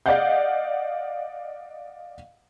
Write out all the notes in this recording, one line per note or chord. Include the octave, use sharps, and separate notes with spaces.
D5 D#5 F5 F#5 G6